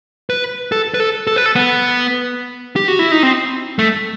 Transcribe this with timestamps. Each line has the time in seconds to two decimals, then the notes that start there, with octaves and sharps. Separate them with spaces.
0.30 B4
0.72 A4
0.94 B4
1.00 A4
1.27 A4
1.36 B4
1.46 A4
1.56 B3
2.76 G4
2.88 F#4
2.99 E4
3.11 D#4
3.23 C4
3.79 A3